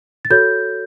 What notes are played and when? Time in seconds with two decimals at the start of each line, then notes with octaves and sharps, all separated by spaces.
0.25 A6
0.30 F#4 A4 C#5 G6